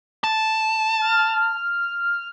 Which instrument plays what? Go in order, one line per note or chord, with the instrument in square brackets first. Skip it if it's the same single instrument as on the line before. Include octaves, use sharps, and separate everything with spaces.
[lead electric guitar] A5
[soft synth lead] F6